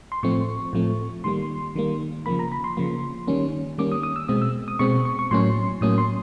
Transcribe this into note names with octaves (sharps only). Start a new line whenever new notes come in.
C6
A2 F3 A3 C4 C#6
A2 F3 A3 C4
D#3 G3 A#3 C6
D#3 G3 A#3
C#3 F3 A#3 B5
A#5
B5
C6
C#3 F3 A#3
D#3 G3 A#3 C#4
D#3 G3 A#3 C#4 D6
D#6
D#6
E6
B2 G#3 C4 D#6
E6
D#6
B2 G#3 C4 C#6
C#6
C#6
A2 F#3 A#3 C#4 C6
A2 F#3 A#3 C#4 D#6
C6